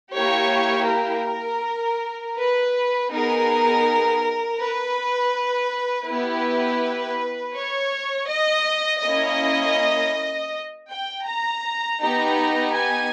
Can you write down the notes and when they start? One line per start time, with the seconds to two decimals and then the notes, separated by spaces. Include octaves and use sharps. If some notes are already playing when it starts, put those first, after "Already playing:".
0.13 A#3 E4 G4 C#5
0.88 A#4
2.36 B4
3.10 B3 D#4 G#4 A#4
4.59 B4
6.07 B3 E4 G4 B4
7.54 C#5
8.29 D#5
9.03 A#3 C#4 E4 D#5
10.89 G5
11.26 A#5
12.00 B3 D#4 G4 A#5
12.74 G#5